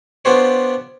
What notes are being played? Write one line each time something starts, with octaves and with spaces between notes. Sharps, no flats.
B3 D4 F4 G4 C5 C#5